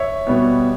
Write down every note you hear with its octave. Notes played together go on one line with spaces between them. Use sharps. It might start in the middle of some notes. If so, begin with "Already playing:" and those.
Already playing: C#5 E5
B2 G3 B3